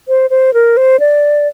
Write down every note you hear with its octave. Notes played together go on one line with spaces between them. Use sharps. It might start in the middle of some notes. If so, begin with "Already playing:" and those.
C5
C5
A#4
C5
D5